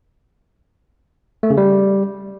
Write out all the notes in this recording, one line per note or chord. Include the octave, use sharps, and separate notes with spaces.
A3
C#3
G3